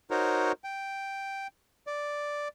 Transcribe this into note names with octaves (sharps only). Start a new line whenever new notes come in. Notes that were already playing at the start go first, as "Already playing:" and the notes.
D#4 F#4 A#4 C5 C#5
G5
D5